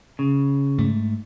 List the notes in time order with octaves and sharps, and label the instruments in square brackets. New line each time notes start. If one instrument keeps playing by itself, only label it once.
[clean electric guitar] C#3
[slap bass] G#2 A3